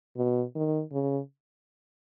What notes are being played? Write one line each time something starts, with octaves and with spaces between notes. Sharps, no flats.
B2
D#3
C#3